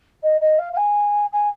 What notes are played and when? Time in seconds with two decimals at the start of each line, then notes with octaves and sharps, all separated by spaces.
0.23 D#5
0.41 D#5
0.58 F5
0.73 F5
0.77 G#5
1.32 G#5